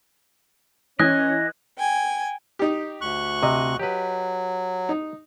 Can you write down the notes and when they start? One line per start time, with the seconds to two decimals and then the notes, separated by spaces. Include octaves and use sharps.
0.99 E3 C#4 C#5 D#5 G#5 F#6
1.78 G5 G#5
2.59 D#4 G4
3.01 D2 C#6 F#6
3.43 C3 D#5
3.79 F#3 G4 B4
4.89 D#4